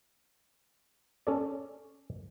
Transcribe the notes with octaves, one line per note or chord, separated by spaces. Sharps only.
C#4 A4 D5